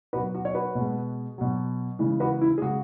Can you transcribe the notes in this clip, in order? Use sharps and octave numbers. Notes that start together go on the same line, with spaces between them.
B2 F#3 F#4 B4
F#4
C#5
F#4 B4
B2 G#3
B2 F#3
C#3 E3 G#3
F#4 B4
E4
G#4
C#3 G#3 F#4